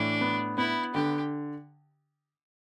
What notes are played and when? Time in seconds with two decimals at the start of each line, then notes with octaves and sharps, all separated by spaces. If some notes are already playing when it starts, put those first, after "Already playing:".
Already playing: A2 E3 D4
0.21 B3
0.58 B3 E4
0.95 D3 G4